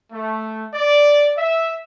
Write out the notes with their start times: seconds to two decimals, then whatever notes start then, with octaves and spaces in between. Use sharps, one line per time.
0.12 A3
0.74 D5
1.38 E5